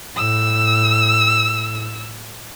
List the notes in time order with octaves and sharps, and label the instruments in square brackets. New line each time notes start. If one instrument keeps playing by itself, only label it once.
[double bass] A2 [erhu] E6